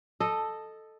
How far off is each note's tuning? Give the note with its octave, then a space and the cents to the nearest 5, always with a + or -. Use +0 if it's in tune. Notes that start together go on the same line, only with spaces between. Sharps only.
A4 +0 D#5 -10